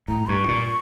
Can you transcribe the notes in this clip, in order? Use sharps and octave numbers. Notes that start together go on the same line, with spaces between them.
A2 A#5
G2 C#6
A#2